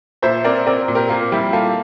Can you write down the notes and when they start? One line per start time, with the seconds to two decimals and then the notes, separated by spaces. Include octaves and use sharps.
0.22 A#2 C5 E5
0.44 C4 A#4 D5
0.66 C4 A#4 D5
0.88 A#2
0.95 G4 A#4
1.10 A#3 F4
1.32 G3 E4 G4
1.53 A#3 F4 A4